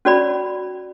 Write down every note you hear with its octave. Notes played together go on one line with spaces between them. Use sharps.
C#4 F#4 D5 B5